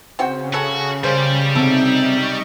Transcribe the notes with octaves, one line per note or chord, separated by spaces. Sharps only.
C#3 C4 F#4 G5
C#4 F#4 A4
G3 G#3 A#3 G4 C5
C3 F#3 D#4 A4 E5 E7
D#5 C#6